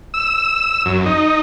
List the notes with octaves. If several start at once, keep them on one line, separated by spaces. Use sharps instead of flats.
E6
F#2
D#4